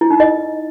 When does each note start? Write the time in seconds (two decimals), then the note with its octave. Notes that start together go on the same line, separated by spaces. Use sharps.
0.01 E4
0.11 D#4
0.20 D#5